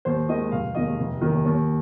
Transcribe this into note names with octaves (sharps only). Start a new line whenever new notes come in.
D#2 C5
D#3 G#3 D#5
F1 F5
D#2 D#3 G#3 D#5
F1
D#2 D#3
D#2